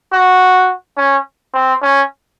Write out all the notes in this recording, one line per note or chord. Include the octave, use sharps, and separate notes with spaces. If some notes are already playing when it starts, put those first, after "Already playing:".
F#4
C#4
C4
C#4